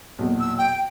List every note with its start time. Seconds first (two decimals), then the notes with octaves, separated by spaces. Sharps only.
0.19 B1 E2 A#2
0.40 E6
0.58 G5